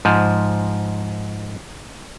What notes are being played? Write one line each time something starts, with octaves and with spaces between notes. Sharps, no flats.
G#2 F3